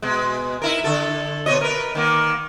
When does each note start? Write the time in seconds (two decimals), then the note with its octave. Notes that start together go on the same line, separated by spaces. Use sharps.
0.02 B2 G#3
0.62 D#4 E4 A#4
0.84 D3 A4
1.46 B2 C#5 D#5
1.61 A#4 B4
1.95 D#3 A#3